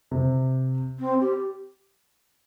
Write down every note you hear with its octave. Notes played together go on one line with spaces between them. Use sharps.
C3
C4
G4